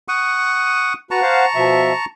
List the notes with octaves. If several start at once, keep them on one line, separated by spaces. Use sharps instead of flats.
F#5 C#6 D#6
F#4 B4 F#5 A5 A#5 C#6
C5 F5 F#5
B2 F3 E5